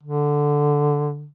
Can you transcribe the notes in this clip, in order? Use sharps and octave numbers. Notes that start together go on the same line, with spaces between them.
D3